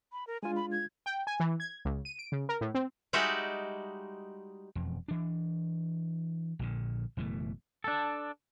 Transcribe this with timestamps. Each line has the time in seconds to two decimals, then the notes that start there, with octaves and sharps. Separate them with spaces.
0.12 B5
0.27 A#4
0.43 G#3 D4 F4 G#5
0.56 B5
0.72 G#6
1.06 G5
1.27 G#5
1.40 E3
1.60 G#6
1.85 C#2
2.05 D#7
2.19 D7
2.32 C#3
2.49 A#4
2.61 A2
2.74 C4
3.13 G3 G#3 D#4 F#4 G4 E5
4.75 E1 F2
5.08 E3 D4
6.59 A#1 A#2 D3
7.17 F#1 B2 E3 A3
7.84 D4 A4